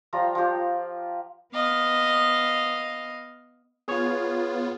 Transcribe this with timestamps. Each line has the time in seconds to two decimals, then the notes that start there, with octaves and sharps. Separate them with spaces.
0.13 F3 G3 F4 A#5
0.35 F3 G4
1.53 B3 D#5 F5
3.88 B3 F4 G#4 C#5 C#6